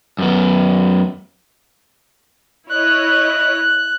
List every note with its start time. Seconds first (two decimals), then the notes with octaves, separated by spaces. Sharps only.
0.19 F#2 B3
2.69 E4 C#5 D#5 F#6